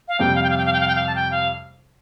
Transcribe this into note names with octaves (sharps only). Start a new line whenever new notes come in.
F5
F2 C3 G3 G5
F5
G5
F5
G5
F5
G5
F5
G5
F5
A5
G5
F5